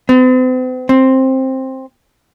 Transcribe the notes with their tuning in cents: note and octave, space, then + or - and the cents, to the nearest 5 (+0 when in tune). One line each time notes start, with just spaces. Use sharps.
C4 -45
C4 +10